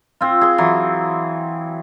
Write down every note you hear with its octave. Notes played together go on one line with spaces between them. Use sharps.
C4 F4
G#4 C6
E3 F#3